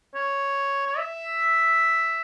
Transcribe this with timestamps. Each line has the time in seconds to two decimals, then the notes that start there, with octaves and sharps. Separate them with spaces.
0.15 C#5
0.86 C#5
0.98 E5